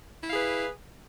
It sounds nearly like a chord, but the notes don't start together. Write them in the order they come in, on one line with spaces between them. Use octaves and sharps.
E4 F5 G#4 B4